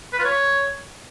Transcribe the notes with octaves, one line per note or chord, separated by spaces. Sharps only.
B4
F4
C#5